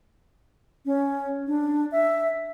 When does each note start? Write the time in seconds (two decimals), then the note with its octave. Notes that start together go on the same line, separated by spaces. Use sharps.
0.86 C#4
1.47 D4
1.92 E5